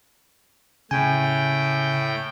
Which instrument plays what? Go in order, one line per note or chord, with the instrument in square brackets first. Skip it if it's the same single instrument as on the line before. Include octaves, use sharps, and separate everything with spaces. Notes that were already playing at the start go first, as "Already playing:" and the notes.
[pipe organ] A2 G5 [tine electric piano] C#3 G#5